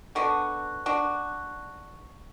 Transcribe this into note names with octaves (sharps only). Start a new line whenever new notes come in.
D3 B3 D4 F#4
D4 F#4